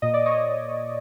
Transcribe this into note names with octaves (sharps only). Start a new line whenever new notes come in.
A#2 D#5
D5
C#5 D#5